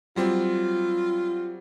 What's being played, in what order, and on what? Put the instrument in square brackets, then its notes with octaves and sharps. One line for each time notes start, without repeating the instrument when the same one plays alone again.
[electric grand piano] F#3 G3 C4 [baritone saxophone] F4